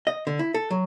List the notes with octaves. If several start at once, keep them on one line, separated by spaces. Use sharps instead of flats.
D#5
D3
E4
A4
F#3